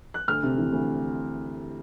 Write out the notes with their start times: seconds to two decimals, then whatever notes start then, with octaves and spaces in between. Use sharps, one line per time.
0.14 F#6
0.28 D2 F6
0.43 C3
0.58 E3
0.72 D2